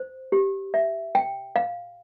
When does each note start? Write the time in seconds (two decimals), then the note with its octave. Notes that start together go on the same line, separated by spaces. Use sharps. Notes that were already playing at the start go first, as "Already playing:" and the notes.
Already playing: C5
0.32 G4
0.74 E5
1.15 G5
1.56 F5